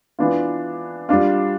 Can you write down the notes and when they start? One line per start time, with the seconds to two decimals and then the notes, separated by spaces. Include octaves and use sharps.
0.19 E3 B3 D4 F4
1.09 G3 D4 F4